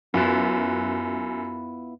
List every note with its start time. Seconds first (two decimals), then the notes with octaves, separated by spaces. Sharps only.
0.14 F#2 B3 E4 F4